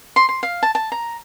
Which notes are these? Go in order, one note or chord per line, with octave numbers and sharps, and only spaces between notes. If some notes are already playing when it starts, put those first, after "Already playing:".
C6
C6
F5
A5
A5
A#5